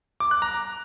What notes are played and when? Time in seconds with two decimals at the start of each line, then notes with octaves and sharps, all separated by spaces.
0.20 D6
0.31 F#6
0.42 A#5